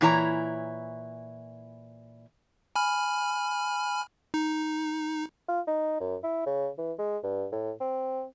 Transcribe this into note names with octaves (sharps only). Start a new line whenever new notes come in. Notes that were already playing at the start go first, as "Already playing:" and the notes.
A#2 E3 E4 C#5 A5 A#5
G#5 B5 F6
D#4
F4
D#4
F#2
E4
C#3
E3
G#3
G2
A2
C4